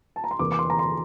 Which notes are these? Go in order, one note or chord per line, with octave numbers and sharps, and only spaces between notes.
A5
A#5
C6
E2 C3 E3 A#3 D6
D6
C6
A#5
C6